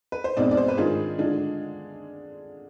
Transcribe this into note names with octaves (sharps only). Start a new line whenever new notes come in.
B4
C5
B1 B2 G#3 C4 D#4 D5
D5
C5
B4
G#2 D#3 G#3 D4 F4 G#4
D3 G#3 D4 F4